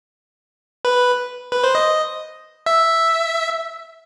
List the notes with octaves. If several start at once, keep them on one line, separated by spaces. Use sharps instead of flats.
B4
B4
C5
D#5
E5